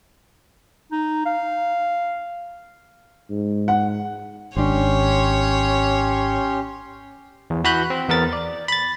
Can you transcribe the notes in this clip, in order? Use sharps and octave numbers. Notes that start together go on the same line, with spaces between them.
D#4
F5
G#2
F#5
G#1 C#4 D4 G4 C#5 C6
E2
E3 F#4 B4 B5 F#6 G6
C4
E2 B3 A#4 A6
D5
B5 A6